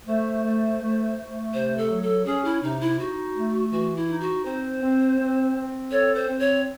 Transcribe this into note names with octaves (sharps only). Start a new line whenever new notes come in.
A3 C5
A3
A3
A3
C3 C5
A4
F#3
A4
C#4 G#4
E4
C3 D#4
E4
D#4 F#4
A3
E3 F#4
E4
D#4
F#4
C4 C5
C4
C4
C4
A4 C#5
C5
C4
C#5